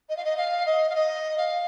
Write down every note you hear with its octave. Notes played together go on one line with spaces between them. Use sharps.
D#5
F5
D#5
F5
D#5
F5
D#5
F5